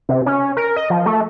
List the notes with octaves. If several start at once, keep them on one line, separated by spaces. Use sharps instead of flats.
C3
C#4
A#4
D#5
F3
A3